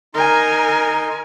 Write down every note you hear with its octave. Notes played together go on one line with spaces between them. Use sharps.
D#4 A#4 G#5 C6